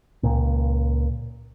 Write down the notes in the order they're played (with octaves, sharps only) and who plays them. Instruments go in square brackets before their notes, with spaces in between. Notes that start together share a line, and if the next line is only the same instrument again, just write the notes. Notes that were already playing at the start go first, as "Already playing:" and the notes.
[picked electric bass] C#2 A#2